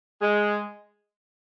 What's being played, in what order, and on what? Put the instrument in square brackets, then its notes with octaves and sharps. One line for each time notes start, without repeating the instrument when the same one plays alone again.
[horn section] G#3